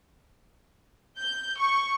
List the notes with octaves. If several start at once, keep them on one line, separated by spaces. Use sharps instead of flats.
G6
C#6